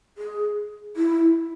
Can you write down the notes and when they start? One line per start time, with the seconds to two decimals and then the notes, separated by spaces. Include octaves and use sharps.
0.18 G#4
0.96 E4